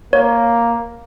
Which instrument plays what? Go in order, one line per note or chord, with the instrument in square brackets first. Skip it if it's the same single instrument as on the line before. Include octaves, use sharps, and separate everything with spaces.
[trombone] A#3 [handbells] C#5